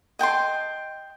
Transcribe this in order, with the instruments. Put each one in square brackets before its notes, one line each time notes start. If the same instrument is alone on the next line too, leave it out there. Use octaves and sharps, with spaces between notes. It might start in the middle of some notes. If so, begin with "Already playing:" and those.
[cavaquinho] D#5 G5 A5 C6